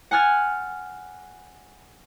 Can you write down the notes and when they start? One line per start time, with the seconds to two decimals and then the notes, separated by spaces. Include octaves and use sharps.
0.11 F#5 G#5 F6 G#6 A6